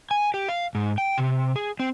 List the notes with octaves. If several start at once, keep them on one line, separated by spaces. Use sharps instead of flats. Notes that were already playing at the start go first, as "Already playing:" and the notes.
G#5
G4
F5
G#2
G5
C3
G#4
C4